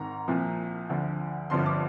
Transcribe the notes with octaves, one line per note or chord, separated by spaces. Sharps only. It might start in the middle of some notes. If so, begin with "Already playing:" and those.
Already playing: G#1 G#2 D#3 A#5
C2 A#2 F3
D2 D3 F3
G1 G2 D3 F3 C6
D6